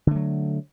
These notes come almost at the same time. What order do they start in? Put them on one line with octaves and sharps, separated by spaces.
D3 A3 F#3